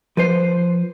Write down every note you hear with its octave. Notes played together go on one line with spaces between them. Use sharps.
F3 B4 C5